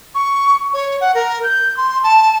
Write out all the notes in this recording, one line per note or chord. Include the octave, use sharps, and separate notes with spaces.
C#6
C#5
F#5
A#4
G6
C6
A5